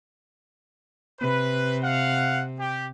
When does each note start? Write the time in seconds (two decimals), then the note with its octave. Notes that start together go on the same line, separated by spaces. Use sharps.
1.20 C3 B4
1.82 F5 F#5
2.59 G4